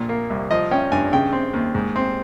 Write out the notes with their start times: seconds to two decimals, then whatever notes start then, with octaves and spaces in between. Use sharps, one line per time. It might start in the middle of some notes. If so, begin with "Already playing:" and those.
Already playing: A#1 A#2
0.09 A#3
0.30 C2
0.51 F3 D#5
0.71 C#4 G5
0.92 G2 G#5
1.12 C#3 G5
1.33 C4
1.53 D#2
1.75 G#2
1.96 C4